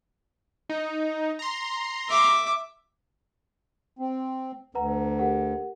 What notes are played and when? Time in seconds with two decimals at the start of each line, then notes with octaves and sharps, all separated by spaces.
0.69 D#4
1.39 A#5 C6
2.09 E5 D6
3.99 C4
4.75 D2 B4 F#5 A#5
5.19 G4 A#4 F#5